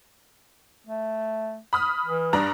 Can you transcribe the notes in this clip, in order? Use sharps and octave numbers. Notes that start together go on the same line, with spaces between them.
A3
B5 D#6 F6
E3
G2 D4 A#5